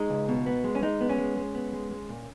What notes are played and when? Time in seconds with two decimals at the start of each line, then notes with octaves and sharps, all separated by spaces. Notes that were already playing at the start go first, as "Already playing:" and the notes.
Already playing: G#3 D#4
0.10 C#2
0.28 B2
0.46 B3
0.64 G#3
0.75 C#4
0.82 G#3 D#4
1.01 B3
1.09 C#4
1.18 G#3
1.37 G#3
1.55 B3
1.73 G#3
1.91 G#3
2.09 A#2